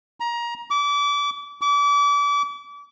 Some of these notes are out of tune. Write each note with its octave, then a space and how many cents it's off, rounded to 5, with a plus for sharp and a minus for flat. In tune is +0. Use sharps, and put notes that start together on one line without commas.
A#5 +25
D6 -30
D6 -35